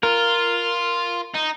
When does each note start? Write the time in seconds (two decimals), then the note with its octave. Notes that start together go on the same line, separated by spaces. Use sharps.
0.03 F4 A#4
1.34 D#4